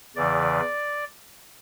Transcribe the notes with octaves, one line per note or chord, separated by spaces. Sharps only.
E2 C#3 E3 D5